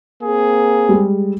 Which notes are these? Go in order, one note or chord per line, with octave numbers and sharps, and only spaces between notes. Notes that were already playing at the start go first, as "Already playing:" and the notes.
A#3 C4 G#4
G3 G#3